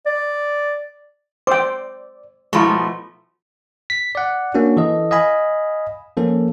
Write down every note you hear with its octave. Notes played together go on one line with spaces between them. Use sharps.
D5
C5 D5 G5 D6 E6
B2 F3 G#3 A3 E4 F4 B5 C#6
B6
D5 F#5
A#3 C#4 D4 F#4
E3 A4 D#5
D#5 F5 G#5 B5
F3 A#3 C#4 A4